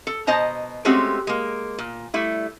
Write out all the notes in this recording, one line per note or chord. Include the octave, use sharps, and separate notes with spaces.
A4
B2 C5 D#5 A5 A#5
G#3 A3 C4 C#4 F#4 G4
G#3 A#3
A#2
G3 A3 E4